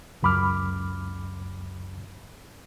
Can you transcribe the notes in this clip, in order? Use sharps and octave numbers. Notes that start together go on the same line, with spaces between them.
C#2 F#2 B5 D6 F6